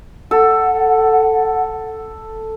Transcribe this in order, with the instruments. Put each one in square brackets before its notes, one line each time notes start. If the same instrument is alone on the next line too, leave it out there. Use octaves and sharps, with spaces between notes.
[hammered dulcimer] A4 [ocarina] F#5